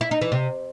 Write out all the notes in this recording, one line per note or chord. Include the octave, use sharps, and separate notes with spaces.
E4
D#4
E3
C3